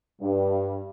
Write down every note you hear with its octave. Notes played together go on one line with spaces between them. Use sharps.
G2